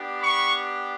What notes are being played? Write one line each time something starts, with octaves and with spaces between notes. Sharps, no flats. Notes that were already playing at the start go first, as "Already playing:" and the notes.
Already playing: B3 D4 G4
B5 C#6